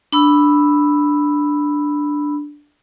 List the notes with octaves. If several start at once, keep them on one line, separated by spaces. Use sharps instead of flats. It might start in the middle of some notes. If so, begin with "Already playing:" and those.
D4 B5 E6